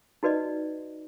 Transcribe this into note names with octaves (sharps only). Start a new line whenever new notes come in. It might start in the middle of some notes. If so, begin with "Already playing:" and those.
D#4 F#4 B4 D5 D#5